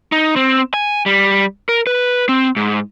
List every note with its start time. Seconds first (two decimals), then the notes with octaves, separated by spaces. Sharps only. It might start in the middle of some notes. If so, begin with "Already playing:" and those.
0.12 D#4
0.36 C4
0.74 G#5
1.06 G3
1.69 A#4
1.87 B4
2.29 C4
2.56 G#2